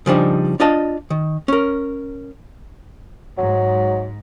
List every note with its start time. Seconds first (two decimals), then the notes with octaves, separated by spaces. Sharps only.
0.06 C#3 F3 G3 D4 D#4
0.60 D4 F4 D#5 A5
1.10 D#3
1.48 C#4 A#4
3.38 G#2 F#3